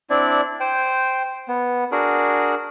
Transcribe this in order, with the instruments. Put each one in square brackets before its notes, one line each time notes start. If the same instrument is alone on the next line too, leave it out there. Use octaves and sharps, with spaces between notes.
[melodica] C4 D4 E4 D5
C5 G5
B3
D4 F#4 G#4 A#4